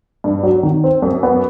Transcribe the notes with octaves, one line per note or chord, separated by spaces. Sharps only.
G2
F#3
D#3
C4
F#2
B3